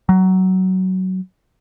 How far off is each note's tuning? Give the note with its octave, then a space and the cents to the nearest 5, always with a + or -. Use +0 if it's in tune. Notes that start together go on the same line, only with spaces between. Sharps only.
F#3 +15